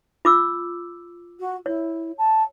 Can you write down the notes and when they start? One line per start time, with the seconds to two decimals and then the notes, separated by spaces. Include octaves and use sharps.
0.25 F4 D6 E6
1.39 F#4
1.66 E4 C#5
2.18 A5